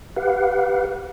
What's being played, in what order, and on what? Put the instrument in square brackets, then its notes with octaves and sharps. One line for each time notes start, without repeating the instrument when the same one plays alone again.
[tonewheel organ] G4 B4 F5 F#5